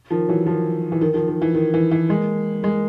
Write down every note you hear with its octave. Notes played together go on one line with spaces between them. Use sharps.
D#3 F3
E3 F#3
D#3 F3
E3
D#3
D#3 F3
D#3
E3
D#3
E3
E3
G#3 A#3
G#3 A#3